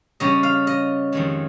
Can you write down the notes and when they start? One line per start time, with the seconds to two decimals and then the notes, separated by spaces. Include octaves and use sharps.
0.20 C#3 G3 C#4 D#5
0.43 F5
0.67 D#5
1.12 F2 D#3 G#3